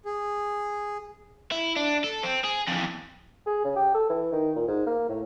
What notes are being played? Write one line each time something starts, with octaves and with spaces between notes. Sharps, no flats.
G#4
E4
D4
A4
C4
G#4
F2 E3
G#4
C#3
G4
A4
E3
D#3
A#2
G#2
A#3
A2